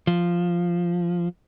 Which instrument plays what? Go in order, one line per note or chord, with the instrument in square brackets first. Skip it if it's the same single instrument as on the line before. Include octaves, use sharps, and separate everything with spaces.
[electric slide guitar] F3